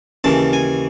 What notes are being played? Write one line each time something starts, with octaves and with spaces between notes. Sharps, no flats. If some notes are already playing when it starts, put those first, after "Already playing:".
D#2 C#3 E3 A5
G#5